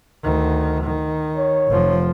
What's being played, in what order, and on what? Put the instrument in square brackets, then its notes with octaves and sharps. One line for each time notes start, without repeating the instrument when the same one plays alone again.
[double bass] D2 D#3
D#3
[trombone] C#5
[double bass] F1 F3